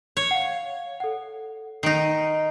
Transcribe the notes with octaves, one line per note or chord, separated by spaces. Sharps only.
C#5
F5 F#5
A4 F#5
D#3 D#4 C7 D7